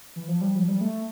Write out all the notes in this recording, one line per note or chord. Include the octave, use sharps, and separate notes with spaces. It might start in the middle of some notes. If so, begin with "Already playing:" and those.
E3
F3
G3
F3
G3
A3